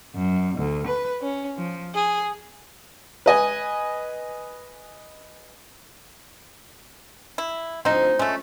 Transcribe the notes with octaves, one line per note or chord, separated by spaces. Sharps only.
F#2
D2
B4
C#4
F3
G#4
B4 D#5 G#5
E4
D2 F3 C4 D#4
G#3 A3 C#4